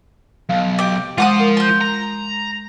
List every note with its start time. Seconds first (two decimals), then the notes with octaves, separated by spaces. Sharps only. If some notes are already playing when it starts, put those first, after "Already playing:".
0.49 B1 F5
0.79 G4 D6
1.18 G#3 F4 C5 F#5 D6 D#6
1.40 A#4
1.57 C6 G6
1.81 A#5